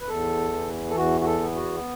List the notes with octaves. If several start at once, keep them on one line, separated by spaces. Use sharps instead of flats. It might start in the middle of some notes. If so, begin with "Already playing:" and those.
B4
E2 A4
E3
A4
E2 F#4
F#4
A4
B3
F#4